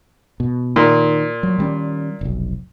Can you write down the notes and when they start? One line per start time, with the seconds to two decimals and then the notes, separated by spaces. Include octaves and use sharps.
0.40 B2
0.76 A#2 D#3
1.43 F#3
1.58 D#3 G3 C#4
2.21 F1 B1